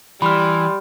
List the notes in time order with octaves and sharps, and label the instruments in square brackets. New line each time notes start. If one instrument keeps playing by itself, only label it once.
[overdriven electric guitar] E3 [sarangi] G3 [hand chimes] B5 F6 [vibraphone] C6